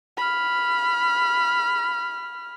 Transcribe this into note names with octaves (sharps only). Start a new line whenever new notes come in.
B5 F6